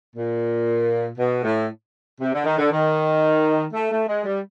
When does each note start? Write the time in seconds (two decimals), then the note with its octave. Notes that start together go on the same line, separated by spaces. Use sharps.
0.16 A#2
1.18 B2
1.44 A2
2.21 C3
2.33 D3
2.46 D#3
2.58 D3
2.72 D#3
3.74 A3
3.91 A3
4.08 G#3
4.24 G3